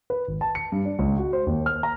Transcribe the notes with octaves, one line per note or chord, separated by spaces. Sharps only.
B4
G#1
A5
C#7
G2
D4
C#2
F#4
C5
D#2
F6
A#5